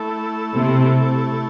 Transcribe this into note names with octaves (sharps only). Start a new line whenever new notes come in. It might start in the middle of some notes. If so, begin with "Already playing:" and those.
Already playing: A3 E4 A4
C3